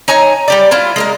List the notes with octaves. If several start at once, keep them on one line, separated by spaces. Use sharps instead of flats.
D#4 C#5 G#5 A#5
G3 G4 D5
E4 F4 C5
G#3 A#3 A#4